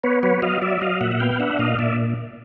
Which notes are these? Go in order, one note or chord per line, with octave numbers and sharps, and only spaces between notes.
B3 B4 C#5
F#3 B4 C#5
F#3 D#5 F5
F#3 D5 E5
F#3 D#5 F5
A#2 E5 F#5
F#5
B3 F5 G5
F5
D4 E5 F#5
A#2 D#5 F5
A#2 D5 E5